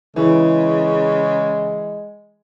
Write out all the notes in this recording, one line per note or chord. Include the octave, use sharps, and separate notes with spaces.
C#3 E3 G#3